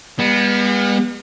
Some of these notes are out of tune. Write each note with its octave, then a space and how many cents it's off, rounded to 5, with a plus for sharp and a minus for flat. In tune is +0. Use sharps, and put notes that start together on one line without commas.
G3 +45 B3 -25